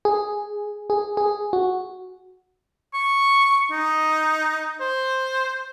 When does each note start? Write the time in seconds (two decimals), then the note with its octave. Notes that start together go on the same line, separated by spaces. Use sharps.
0.05 G#4
0.90 G#4
1.17 G#4
1.53 F#4
2.94 C#6
3.71 D#4
4.80 C5